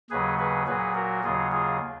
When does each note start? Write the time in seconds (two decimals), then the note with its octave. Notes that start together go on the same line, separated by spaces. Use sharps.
0.10 D#2 C#3 F#3 G#4 B4
0.39 G#4 B4
0.67 A#2 F#3 G#4 B4
0.95 F#4 A#4
1.24 D#2 C#3 F#3 F4 G#4
1.52 F4 G#4